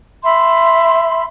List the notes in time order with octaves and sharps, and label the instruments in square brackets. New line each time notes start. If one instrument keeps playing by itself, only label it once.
[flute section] E5 B5 C6